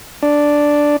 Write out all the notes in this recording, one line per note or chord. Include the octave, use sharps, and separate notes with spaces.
D4